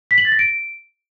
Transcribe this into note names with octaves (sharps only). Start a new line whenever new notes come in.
B6
F#7
A6
A#6
D7